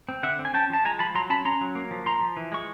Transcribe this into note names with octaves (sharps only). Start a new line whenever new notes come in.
C4
D3 E5 F#5
C4
G#5
C#4 G5 A5
F3 A5
G#3 G#5 A#5
F3 A5 B5
F#3 A#5 C6
C#4 A5 B5
C#4 A#5 C6
F#3
A#3
F3
F3 A#5 C6
F3
E3
G#3 C#6